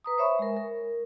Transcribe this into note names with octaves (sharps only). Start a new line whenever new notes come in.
B4 A#5 D#6
C5 C#5 E5 B5 C#6
G#3 A#4
A#4